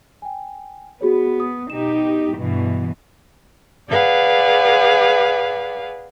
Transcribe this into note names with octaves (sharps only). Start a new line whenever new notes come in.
G5 G#5
B3 F#4 G#4 C#5
D#6
B2 D#4 G4 E7
G2 B2 E3
G#4 B4 D5 F5 F#5